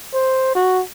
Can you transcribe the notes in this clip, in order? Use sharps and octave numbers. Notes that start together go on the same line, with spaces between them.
C5
F#4